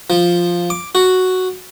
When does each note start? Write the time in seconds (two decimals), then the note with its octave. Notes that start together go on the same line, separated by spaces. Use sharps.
0.10 F3
0.70 D6
0.95 F#4